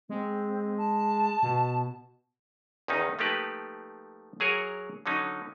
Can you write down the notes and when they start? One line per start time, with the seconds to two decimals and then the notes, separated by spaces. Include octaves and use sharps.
0.09 G#3 C4
0.78 A5
1.43 B2
2.88 E2 D#3 C#4 D#4
3.19 F3 A3 A#3 D#4 G4 B4
4.40 F#3 G#4 A#4 C#5 F#5
5.06 D3 F#3 C#4 D#4